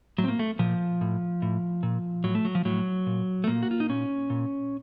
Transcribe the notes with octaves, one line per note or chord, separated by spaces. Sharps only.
A2 F#3
C4
A#3
A3
A#2 F3
A2
A2
A#2
A2 F#3
A3
F#3
F3
A2 F#3
A#2
A3
A#2 A#3
F#4
F4
D#4
A#2 C#4
A#2